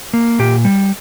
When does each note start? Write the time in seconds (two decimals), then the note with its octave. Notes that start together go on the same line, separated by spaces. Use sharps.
0.13 A#3
0.39 A#2 G4
0.65 G3